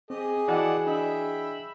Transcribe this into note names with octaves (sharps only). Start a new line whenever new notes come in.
C4 G4 G#4 D#5
E3 F#4 D5 D#5 F#5 G5 A5 D6
D4 D#5 E5 G5 B5